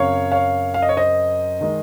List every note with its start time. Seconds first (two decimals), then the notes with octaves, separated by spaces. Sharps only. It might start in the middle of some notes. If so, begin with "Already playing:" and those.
Already playing: F#2 C#3 F#3 C4 C#5 F5
0.32 C#5 F5
0.74 F5
0.82 D#5
0.89 C#5
0.97 C5 D#5
1.61 D#3 G#3 D#4